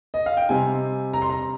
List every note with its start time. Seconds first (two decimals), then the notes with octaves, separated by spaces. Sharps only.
0.14 D#5
0.26 F5
0.37 G5
0.49 C3 G3 C4 D#4 G#5
1.13 A#5
1.22 C6
1.30 A#5